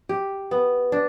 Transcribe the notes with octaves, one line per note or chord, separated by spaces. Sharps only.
G4
B3
D4